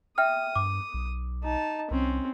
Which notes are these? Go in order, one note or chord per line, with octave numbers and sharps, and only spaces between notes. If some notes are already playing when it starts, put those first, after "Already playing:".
E5 G5 D#6 F6
G2 D6
B1
D#4 A5
C2 C4 C#4